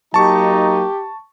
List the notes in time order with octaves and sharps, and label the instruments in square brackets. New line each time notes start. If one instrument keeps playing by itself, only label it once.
[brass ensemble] F#3 A#3 D#4 [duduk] G4 [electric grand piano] A5 C#6